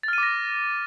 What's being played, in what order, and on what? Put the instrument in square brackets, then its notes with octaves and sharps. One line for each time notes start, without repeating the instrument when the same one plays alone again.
[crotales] A6
F6
D#7
D6
A#6